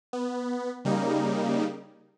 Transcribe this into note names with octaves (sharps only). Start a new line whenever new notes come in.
B3
C#3 G3 A#3 D#4